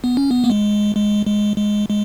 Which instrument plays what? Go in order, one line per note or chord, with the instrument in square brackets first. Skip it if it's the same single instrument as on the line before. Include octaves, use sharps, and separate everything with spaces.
[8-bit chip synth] B3
C#4
B3
A#3
G#3
G#3
G#3
G#3
G#3